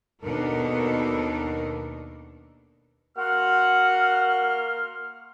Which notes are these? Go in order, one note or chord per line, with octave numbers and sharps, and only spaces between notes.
D#2 B2 B3 D4 A4 A#4
A#3 F#4 F#5 C6 F6